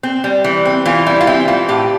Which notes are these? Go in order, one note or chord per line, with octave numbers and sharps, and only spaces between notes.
C4
G3
E3
C4
E3 F4
G3 E4
F4
C4 E4
E3 F4
A2 G4